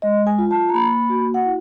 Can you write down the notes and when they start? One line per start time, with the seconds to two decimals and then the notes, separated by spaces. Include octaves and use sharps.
0.02 G#3 D#5
0.27 G#5
0.38 F4
0.51 A5
0.69 A#5
0.74 A#3 B5
1.10 F#4
1.34 F#5
1.45 E4